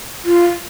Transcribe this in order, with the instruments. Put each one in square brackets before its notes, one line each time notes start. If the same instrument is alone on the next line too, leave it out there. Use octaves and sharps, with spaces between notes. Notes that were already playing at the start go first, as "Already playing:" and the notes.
[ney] F4